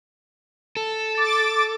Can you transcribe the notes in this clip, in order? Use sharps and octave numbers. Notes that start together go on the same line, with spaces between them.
A4
D6 A6